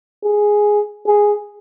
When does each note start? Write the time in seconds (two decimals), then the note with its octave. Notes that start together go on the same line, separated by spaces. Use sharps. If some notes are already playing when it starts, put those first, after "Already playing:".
0.25 G#4
1.07 G#4